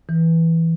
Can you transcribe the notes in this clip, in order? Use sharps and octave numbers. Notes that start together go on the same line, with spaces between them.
E3